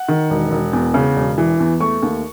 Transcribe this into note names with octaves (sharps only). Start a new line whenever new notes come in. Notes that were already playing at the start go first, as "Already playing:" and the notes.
Already playing: F#5
D#3
E1
E1
E2
C#3
E1
E3
E2
A3 C#6
D#2